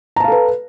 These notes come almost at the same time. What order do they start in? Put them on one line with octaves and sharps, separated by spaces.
A#5 A5 F5 A4 B4